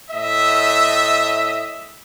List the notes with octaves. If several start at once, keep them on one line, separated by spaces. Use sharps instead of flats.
A2 D#5 E5